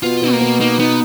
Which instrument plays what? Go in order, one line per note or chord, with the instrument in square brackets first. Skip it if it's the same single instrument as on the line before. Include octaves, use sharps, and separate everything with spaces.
[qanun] B2 [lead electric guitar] F4
[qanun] B2
[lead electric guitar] A#3
[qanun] B2
[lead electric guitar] A#3 [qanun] D#4
[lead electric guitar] B3 [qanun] D#4